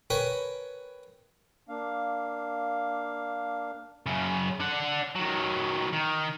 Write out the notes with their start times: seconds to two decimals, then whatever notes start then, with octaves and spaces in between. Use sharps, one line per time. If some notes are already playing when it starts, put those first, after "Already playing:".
0.10 A#4 B4 C#5 G5 G#5 B5
1.69 A#3 D4 F5
4.06 F#2 C#3
4.60 D4 F#5
5.16 D#3 F#3
5.93 D#3